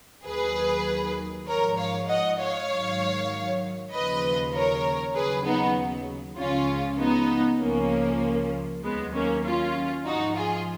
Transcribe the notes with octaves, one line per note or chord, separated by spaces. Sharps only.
D#2 D#3 F#3 G#4 B4
G#2 F3 A#4 C#5
C#5 F5
D#5 F#5
C#5 F5
G#2 D#3 F#3
D#2 C#3 F3 B4 D#5
A#4 C#5
D#2 C#3 F#3 G#4 B4
B3 D#4
C#2 C#3 F3 C#4 F4
B3 D#4
C#2 C#3 F3 A#3 C#4
D#2 D#3 F#3 G#3 B3
A#3 C#4
C#4 F4
G#2 F3 D#4 F#4
F4 G#4